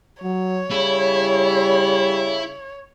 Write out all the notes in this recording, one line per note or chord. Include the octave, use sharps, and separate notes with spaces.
F#3 C#5
C#3 G3 E4